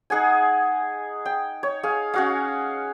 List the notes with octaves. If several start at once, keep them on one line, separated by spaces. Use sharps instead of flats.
D#4 G#4 F#5 G#5
G5
C#5
G#4 F5
C#4 F#4 F5